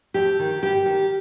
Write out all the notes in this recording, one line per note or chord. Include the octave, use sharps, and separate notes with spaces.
F2 G4
D#3
G2 G4
D#3